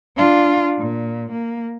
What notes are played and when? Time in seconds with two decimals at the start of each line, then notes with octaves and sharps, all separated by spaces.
0.16 D4 F4
0.78 A#2
1.32 A#3